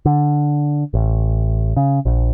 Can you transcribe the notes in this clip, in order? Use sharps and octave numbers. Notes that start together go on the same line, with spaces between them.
D3
A1
C#3
A#1